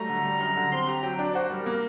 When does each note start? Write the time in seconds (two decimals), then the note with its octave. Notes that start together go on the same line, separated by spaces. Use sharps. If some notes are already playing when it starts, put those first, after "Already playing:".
Already playing: F#3 G3 A3 A#5
0.09 D3
0.25 G3
0.41 F#2
0.56 D3
0.72 C4 C6
0.87 G4 A#5
1.03 F#3 G5
1.19 D4
1.30 D5
1.34 F#4 C5
1.50 G3 A#4
1.66 A#3